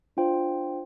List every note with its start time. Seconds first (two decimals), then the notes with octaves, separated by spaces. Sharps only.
0.17 D4 F4 C5 G5